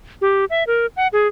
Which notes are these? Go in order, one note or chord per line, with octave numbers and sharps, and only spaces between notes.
G4
E5
A#4
F#5
G#4